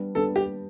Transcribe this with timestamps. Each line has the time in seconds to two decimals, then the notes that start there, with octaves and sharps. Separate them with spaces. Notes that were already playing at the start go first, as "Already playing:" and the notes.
Already playing: G3 B3 D4
0.15 G3 B3 D4 A4
0.36 G4